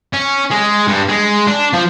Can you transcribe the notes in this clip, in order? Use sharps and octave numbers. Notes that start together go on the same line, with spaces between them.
C#4
G#3
G2
G#3
D4
F3